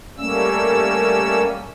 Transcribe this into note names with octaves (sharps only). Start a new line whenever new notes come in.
G3 A3 A#3 C#4 E6